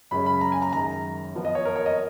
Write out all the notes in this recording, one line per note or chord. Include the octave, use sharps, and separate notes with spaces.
F#2 C#3 G#3 C#4 B5
B5
A#5
G#5
A#5
F#2 D#3 G#3 A#5
F2 F3 B3
D#5
C#5
A#4
C#5
D#5